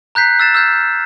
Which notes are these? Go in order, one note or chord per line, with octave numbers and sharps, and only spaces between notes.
A#5 F#6 G6 B6 C7
E6 F#6 A6 C7 E7
E6 F6 G6 A6